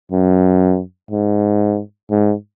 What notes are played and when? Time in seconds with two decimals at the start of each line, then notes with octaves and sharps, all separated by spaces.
0.12 F#2
1.11 G#2
2.11 G#2